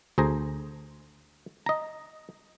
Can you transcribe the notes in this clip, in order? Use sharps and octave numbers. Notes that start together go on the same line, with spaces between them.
D2 G#4 C5 A#5
D#5 A#5